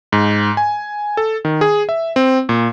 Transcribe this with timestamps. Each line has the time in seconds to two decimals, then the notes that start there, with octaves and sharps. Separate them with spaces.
0.12 G#2
0.57 G#5
1.17 A4
1.45 D#3
1.61 G#4
1.89 E5
2.16 C4
2.49 A#2